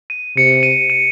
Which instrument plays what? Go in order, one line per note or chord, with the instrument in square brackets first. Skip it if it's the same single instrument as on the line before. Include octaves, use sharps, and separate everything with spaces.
[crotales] D#7
[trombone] C3 [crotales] C#7
[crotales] D#7
D#7